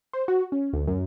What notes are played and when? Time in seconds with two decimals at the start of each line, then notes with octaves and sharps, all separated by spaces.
0.13 C5
0.28 F#4
0.52 C#4
0.73 D2
0.87 F#2